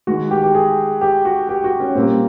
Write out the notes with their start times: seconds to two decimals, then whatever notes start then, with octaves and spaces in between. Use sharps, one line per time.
0.07 D#3 G#3 F#4
0.31 G4
0.43 G4
0.55 G#4
1.01 G4
1.25 F#4
1.49 G4
1.64 F#4
1.80 C#4
1.95 A#2 G3 A#3 C4